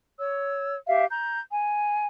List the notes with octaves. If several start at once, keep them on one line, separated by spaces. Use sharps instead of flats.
C#5 E6
G4 E5 F5
A#5 G6
G#5